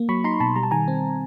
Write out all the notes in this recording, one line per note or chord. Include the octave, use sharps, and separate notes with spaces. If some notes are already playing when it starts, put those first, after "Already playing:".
Already playing: A#3
F#3 B5 C#6
D#4 A#5 C6
B2 A5 B5
G3 A#5
A5
D#3 G#5 A#5
C4